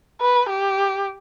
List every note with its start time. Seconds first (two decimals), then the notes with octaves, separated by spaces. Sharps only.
0.21 B4
0.49 G4